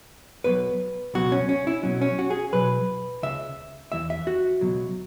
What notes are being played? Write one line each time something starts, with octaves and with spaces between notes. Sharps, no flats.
B1 B2 F#3 B4
C#2 B2 F#3 F#4
C#4
C#4
E4
B1 B2 F#3 C#4
C#4
F#4
G#4
B1 B2 F#3 B4
C#2 C#3 E5
E2 E3 E5
E5
F#4
C#2 B2 F#3